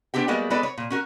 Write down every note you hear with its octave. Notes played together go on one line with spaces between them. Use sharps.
B3 C4 D4 G4 G5
G3 G#3 A#3 B3 F#4 D5
G#3 B3 A4 B4 D5
C#5
A#2
C#4 F#4 A#4